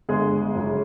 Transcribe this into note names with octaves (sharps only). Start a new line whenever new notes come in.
G1 G#3 G#4
F#2 C#3